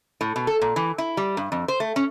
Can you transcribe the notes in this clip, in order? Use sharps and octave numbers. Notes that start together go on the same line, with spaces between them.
A2
B2
A4
A#2
E3
E4
G3
G2
F2
C5
A3
C#4